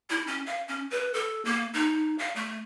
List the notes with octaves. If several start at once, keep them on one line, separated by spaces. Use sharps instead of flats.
E4
C#4
F5
C#4
B4
A4
A#3
D#4
F5
A3